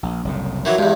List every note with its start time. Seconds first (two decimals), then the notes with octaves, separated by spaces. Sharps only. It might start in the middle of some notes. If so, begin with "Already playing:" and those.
0.03 A#1
0.25 F#1 C2 A2
0.65 D#3 E3 F#3
0.78 E2 G2 G#3